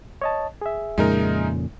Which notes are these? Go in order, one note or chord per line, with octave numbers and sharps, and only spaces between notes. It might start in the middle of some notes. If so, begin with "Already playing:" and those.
C#5 D#5 A5
G#4 E5
F2 A#2 C#3 G#3 D#4 A#4